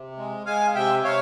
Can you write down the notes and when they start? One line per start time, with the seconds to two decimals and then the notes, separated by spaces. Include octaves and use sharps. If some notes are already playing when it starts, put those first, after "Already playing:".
Already playing: C3
0.17 G#3
0.46 G#3 F5 G#5
0.75 C3 E5 G5
1.04 C3 C#5 F5